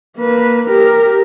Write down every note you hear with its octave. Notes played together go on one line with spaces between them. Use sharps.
A#3 B4
G4 A#4